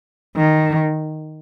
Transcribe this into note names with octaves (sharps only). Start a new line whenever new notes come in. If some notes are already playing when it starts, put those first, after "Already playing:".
D#3